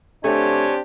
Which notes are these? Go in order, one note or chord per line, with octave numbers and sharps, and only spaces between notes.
D3 A3 C4 D4 G4 C#5 G#5